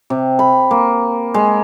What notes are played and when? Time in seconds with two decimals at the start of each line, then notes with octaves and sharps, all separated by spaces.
0.10 C3
0.39 B5
0.71 A#3
1.34 G#3